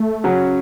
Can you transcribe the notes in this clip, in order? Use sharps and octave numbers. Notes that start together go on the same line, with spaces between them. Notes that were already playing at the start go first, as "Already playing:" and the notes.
Already playing: A3
C#3 F#3 C#4